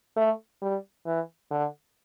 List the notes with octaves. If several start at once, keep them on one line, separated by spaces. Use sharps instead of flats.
A3
G3
E3
D3